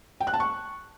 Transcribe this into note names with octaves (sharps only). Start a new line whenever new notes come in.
G5
F#6
A5
C#6